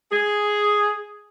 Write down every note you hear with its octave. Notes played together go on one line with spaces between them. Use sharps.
G#4